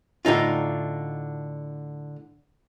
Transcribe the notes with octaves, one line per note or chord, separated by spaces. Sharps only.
A2 D3 D#4 F4